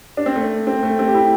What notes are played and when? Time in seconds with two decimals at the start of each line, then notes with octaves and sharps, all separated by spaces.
0.17 D4
0.26 C4
0.36 A3
0.67 C4
0.83 A3
0.99 C4
1.08 G4
1.15 E4